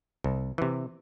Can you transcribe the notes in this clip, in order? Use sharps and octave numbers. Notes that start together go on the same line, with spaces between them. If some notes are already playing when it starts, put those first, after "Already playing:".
C2
C3 E3